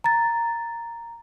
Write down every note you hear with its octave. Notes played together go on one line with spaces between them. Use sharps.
A#5 A6